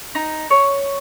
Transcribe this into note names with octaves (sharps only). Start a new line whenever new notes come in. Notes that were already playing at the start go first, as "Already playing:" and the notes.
D#4
C#5